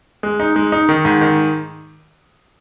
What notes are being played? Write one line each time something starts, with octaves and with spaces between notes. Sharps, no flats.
G#3
D#4
G#3
D#4
D#3
G#2
D#3